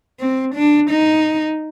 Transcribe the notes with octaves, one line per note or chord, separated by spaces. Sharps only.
C4
D4
D#4